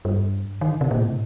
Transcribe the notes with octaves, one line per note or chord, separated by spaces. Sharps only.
G2
D#3
D3
C3
A#2
A2
C3